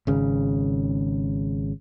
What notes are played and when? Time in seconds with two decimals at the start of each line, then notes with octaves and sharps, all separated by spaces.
0.07 G#1 C#3